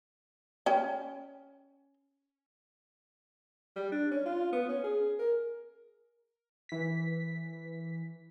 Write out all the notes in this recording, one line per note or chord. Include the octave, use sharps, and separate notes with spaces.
C#4 G5
G3
D4
C#4
F4
B3
C#4
G#4
A#4
E3 B6